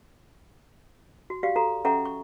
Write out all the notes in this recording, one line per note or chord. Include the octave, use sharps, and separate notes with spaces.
F#4
F#4 G4 D5 F5
F#4 A4 A#5
C#4 A4 E5 F#5 A#5 C#6
C#6